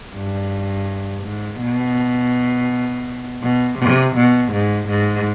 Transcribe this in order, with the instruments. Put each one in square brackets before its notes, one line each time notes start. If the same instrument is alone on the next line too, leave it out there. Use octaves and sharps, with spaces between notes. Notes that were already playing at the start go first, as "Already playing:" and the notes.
[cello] G2
G#2
B2
B2
C3
B2
G#2
G#2